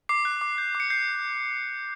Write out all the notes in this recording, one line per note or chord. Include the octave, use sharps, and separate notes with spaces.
D6 C7
F#6
D6
G6
D6
C#7
G6 C7